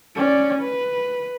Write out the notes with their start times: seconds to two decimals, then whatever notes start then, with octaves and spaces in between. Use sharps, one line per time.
0.15 C#4 D5
0.61 B4